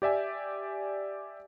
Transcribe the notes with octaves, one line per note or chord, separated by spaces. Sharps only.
G4 D5 E5 G#5